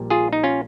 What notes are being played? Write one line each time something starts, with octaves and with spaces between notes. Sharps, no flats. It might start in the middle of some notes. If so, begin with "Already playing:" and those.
Already playing: A#1 A#2 G3
F4 G#4
D#4
C#4 F4